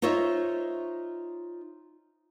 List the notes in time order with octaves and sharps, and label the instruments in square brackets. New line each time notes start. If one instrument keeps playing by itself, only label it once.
[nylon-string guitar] D#4 F4 C5 C#5 D#5 E5